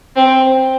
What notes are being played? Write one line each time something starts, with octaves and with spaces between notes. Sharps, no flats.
C4